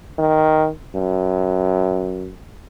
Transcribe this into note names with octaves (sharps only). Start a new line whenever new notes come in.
D#3
F#2